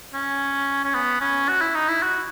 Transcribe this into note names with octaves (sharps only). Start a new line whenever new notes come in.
C#4
C#4
B3
C#4
F#4
E4
D#4
E4
F#4